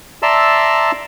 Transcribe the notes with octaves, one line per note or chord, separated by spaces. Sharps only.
D5 E5 A5 A#5 C6 E6